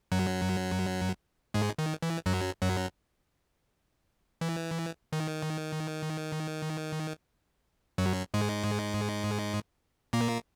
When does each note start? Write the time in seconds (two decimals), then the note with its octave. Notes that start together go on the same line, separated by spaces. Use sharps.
0.12 F#2 F#3
1.54 G#2 G#3
1.78 D#3
2.02 E3
2.26 F#2 F#3
2.62 F#2 F#3
4.41 E3
5.13 D#3
7.98 F#2 F#3
8.34 G#2 G#3
10.13 A#2 A#3